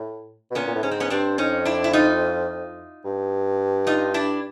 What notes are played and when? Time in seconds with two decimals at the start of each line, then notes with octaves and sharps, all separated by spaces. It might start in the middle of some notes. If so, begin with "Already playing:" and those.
Already playing: A2
0.51 B2
0.55 A#2 B3 C#4
0.68 A#2
0.75 A2
0.83 G#2 C#4
0.91 C4
1.00 B3 C#4
1.10 G2 C4 D4
1.38 F2 C#4 D#4
1.65 D4 E4
1.84 E4
1.93 D#4 F4
3.04 G2
3.87 D#4 F4
4.14 D4 E4